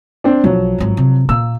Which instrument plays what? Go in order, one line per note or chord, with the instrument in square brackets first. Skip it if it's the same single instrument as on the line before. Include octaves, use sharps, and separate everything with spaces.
[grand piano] C4 D4
[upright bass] B1 [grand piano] F3 F#3
[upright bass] G#1 G#2
C3
[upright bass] A#2 A#3 [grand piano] E6